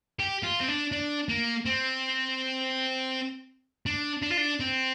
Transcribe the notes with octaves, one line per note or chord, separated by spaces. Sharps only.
G4
F4
C4
D4
D4
A#3
C4
D4
D4
F4
D4
C4